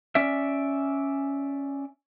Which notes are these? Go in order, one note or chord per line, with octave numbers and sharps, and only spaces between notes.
C#4 D5 E5